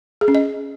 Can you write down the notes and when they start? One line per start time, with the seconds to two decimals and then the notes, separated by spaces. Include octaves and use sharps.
0.21 G#4
0.28 C#4
0.35 D#5